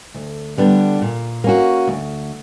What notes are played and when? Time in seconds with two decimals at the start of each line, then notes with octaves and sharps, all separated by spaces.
0.14 D2
0.57 D3 G3 B3 D4
1.02 A#2
1.44 A#3 C#4 F#4
1.87 D2